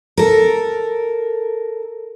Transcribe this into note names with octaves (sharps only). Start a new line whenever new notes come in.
A4 A#4